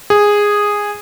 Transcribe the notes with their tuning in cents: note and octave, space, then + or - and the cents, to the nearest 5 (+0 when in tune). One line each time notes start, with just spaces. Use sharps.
G#4 -10